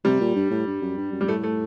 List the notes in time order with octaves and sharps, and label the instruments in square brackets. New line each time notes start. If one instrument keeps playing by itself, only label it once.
[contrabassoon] C3 [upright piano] G3
[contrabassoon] A#2
G2
A2
G2
F#2
G2
F#2
[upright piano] G3
[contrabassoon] A2 [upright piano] A3
[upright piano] A3